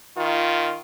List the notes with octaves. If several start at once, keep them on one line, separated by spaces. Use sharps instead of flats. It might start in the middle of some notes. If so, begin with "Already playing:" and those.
D#3 F4